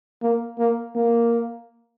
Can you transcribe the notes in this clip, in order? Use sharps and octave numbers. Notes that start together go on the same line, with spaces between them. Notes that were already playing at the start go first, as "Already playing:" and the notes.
A#3
A#3
A#3